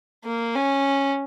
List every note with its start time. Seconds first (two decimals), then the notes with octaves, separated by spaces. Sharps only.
0.25 A#3
0.55 C#4